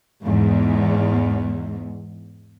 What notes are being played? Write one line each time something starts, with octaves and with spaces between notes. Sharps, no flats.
E2 G#2